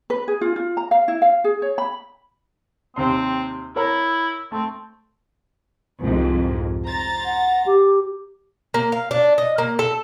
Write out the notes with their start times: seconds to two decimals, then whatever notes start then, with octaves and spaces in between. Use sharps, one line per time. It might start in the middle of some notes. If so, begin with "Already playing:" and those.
0.10 B4
0.28 G#4
0.41 F4
0.56 F4
0.77 A#5
0.91 F5
1.08 E4
1.22 F5
1.44 G#4
1.62 C#5
1.78 B5
2.96 D#2 C3 C4 C6
3.76 E4 A#4 C#5 A#5
4.52 A3 C4
6.00 C2 F2 G#2
6.85 C5 A#5 A6
7.25 F#5
7.66 G4
8.74 A#3
8.92 F5
9.11 D4
9.38 D#5
9.58 A#3
9.79 A4